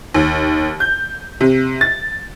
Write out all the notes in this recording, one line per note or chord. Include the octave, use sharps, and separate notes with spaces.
D#2
G6
C3
A6